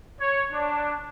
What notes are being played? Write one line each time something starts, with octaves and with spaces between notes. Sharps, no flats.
C#5
D4